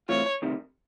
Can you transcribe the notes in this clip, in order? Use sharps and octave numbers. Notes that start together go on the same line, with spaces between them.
G2 E3 A3 C4 F4 C#5
D2 C3 D#3 G3